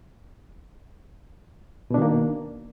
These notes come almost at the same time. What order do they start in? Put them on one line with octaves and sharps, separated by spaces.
B2 D4 D#3 A#3